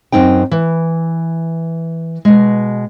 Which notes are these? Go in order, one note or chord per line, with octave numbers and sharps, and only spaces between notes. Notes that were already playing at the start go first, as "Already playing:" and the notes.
F#2 C4 D#4 G5
E3
B2 G#3